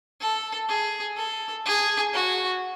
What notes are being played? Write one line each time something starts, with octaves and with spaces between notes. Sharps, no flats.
A4
G#4
A4
G#4
F#4